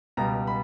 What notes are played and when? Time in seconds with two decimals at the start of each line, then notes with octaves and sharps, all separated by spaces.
0.17 C#2 B2 G3 A#5
0.47 B5